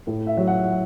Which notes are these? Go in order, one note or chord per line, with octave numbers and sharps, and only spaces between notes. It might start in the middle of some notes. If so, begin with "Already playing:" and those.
A2
E5
F#3
F#5